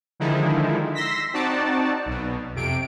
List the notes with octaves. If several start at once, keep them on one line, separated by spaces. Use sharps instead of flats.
D3 D#3 F3 G#3 D#4 E4
C6 E6 A#6 B6
C4 D#4 F#4 D5 A5
B1 B2
F2 C3 D7